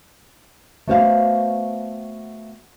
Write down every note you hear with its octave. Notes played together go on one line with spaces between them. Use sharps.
A3 B3 F#4 C5 C#5 F5